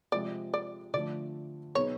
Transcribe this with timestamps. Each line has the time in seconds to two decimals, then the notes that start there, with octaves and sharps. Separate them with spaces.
0.12 C3 F3 G#3 D5
0.54 D5
0.94 D3 F3 A3 D5
1.75 B2 F#3 B3 D#4 G#4 C#5